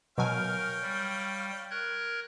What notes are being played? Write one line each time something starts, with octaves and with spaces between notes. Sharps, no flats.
B2 F#3 A#4 C#5 F5 G5 G#5
G3
A#4 F#6 G#6